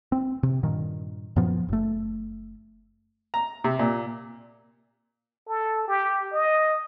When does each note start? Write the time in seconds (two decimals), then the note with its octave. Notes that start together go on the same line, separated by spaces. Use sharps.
0.12 C4
0.43 C3
0.63 G2 A#2 D#3
1.36 F#2 A#2 F3 B3
1.68 F#1 A3
3.34 A#5
3.64 C3
3.79 A#2
5.48 A4
5.87 G4
6.33 D#5